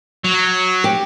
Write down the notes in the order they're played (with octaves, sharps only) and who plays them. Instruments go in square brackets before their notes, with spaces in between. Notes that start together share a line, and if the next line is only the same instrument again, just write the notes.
[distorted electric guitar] F#3
[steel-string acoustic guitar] G4